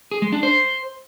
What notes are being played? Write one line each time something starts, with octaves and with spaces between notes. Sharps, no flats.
G#4
G#3
D4
C5